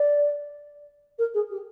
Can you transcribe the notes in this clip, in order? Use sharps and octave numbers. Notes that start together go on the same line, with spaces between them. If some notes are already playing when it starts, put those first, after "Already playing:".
Already playing: D5
A#4
G#4
G4